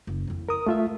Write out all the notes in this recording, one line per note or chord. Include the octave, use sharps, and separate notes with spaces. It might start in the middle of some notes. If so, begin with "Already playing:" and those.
F#1
F2 E4
A#4 D#6
A3 E4 F4 E5